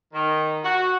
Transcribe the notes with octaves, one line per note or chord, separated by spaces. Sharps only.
D#3
F#4